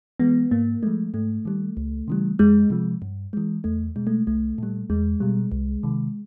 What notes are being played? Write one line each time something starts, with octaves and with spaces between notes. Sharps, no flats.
E3 G#3 B3
G#2 A#3
F3 G#3 A3
G#2 A3
D#3 G3
C#2
C#3 E3 G3
F2 G#3
C3 F3 G#3
G2
E3 G#3
E2 A3
B2 G#3
A3
C2 A3
A#2 G3
E2 G#3
B2 G3
C2
C3 D#3